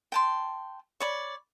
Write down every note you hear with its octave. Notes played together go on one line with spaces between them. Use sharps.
G5 A5 C6
C#5 D5 B5